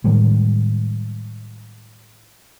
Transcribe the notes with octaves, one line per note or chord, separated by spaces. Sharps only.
A2 D#3 G3 G#3